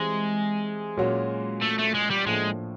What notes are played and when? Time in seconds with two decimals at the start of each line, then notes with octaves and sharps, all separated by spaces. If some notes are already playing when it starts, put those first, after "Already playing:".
Already playing: E3 G3 G#3 C4
0.97 A#2 F#3 A#3 C#4 F#4
1.61 A3
1.78 A3
1.94 G#3
2.11 G3
2.26 A2 F3 G#3 A#3 D4